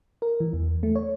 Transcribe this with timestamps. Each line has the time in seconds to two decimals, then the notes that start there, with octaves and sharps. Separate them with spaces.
0.22 A#4
0.40 E3
0.53 E2
0.83 A3
0.95 C#5